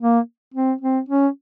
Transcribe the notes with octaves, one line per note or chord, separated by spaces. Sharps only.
A#3
C4
C4
C#4